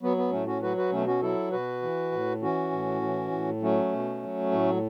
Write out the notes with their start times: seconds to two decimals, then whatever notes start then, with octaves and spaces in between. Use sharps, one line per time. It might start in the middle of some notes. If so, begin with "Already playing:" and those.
0.02 F#3 B3
0.17 B3
0.31 A2 A3 C#4
0.47 C#4 F#4
0.62 F#3 F#4 B4
0.77 F#4 B4
0.91 B2 A3 C#4
1.07 C#4 F#4
1.22 F#3 E4 A4
1.52 B2 F#4 B4
1.82 E3
2.12 A2
2.42 E3 C#4 F#4
2.71 A2
3.02 E3
3.31 A2
3.62 F#3 A3 C#4
3.92 B2
4.22 F#3
4.52 A2